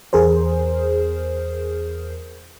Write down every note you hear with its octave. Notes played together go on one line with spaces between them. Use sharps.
E2 G#4 A#4 C5